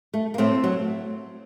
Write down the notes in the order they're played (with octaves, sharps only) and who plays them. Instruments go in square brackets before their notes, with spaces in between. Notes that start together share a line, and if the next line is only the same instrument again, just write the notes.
[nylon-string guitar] A3
A#3
A2 A3 C4
F#3